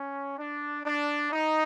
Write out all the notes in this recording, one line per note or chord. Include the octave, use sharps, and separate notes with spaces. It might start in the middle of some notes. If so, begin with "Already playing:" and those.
Already playing: C#4
D4
D4
D#4